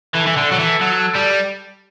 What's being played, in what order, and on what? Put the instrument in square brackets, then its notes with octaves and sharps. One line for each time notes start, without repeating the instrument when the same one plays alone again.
[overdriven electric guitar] E3 [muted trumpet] A4
[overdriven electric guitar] E3
D3
F#3
E3
F#3
G3